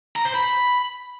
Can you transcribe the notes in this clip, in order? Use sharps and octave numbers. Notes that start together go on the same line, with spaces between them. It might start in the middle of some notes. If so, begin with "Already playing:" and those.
A#5
C5
B5